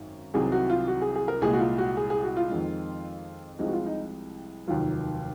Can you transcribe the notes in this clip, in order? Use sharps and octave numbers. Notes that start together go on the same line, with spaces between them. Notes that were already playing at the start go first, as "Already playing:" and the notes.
Already playing: G#1 F#2
C2 C3 D#3 F#3 G#4
F#4
F4
F#4
G#4
G#4
A#4
C2 A#2 G#3 G#4
F#4
F4
F#4
G#4
G#4
F#4
F4
F2 D#3 G#3
C2 C3 F3 G#3 D#4
F#4
F4
D#4
F1 D#2 D#3 F#3 F4